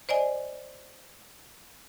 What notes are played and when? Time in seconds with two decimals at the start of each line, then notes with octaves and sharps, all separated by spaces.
0.09 C5 D5 D#5 G#5